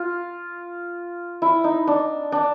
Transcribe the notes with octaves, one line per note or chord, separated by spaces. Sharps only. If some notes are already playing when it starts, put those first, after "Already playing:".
Already playing: F4
E4
D#4
D4
D4